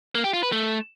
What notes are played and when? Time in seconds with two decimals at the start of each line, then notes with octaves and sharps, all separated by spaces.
0.15 A#3
0.24 G4
0.34 F4
0.43 B4
0.52 A3